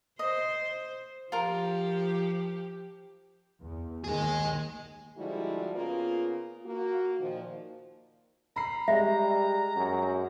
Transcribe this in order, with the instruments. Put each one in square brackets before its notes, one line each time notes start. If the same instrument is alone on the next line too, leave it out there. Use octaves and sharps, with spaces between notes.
[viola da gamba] C5 [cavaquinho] D#5
[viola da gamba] F3 G4 [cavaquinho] F4 A#4
[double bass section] E2
[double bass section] D#2 D#3 [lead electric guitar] G#3 G#4
[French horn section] D3 F3 G3 G#3 E4 F#4
C#3 A#3 B3 F4
A#3 F#4
A#2 D#3 F3
[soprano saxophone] A#5 [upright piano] B5 C7
[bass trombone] G3 [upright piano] G#3 [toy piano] E5
[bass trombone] F#2